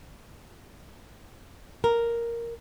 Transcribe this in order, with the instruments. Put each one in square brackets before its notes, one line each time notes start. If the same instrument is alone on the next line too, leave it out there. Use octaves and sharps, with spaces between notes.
[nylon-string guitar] A#4